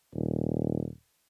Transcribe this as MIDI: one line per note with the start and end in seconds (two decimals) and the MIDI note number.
0.14 0.89 27